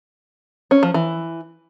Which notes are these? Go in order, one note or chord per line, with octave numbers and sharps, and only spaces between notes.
C#4
F3
E3